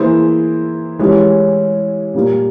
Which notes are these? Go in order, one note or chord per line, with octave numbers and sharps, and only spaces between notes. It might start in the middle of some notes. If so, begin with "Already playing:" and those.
Already playing: E3 A#3 E4 G#4 C5
E3 G#3 C#4 E4 G4
A#2 G3 A#3